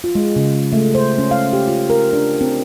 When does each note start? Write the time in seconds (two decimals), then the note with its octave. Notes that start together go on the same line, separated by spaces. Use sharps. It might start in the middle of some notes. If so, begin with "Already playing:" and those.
0.04 F4
0.15 G#3
0.36 C#3
0.73 A3
0.95 C5
1.18 C#4
1.31 F5
1.53 G4
1.68 F4
1.90 A#4
2.13 D4
2.41 C4